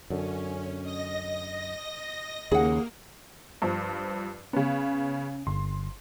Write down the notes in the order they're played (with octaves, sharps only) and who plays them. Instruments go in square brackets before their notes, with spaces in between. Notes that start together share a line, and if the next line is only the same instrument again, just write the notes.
[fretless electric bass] F#2 D3 [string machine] C#4
[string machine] D#5 A#6
[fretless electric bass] D#2 C#3 [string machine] A#3 [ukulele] G#4 F#5
[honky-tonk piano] G2 F3
[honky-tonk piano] C#3 B3 [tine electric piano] C#4
[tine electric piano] G1 [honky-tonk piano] C6